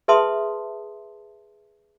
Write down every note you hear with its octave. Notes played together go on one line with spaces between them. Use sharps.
G#4 B4 E5 A5 C6 D#6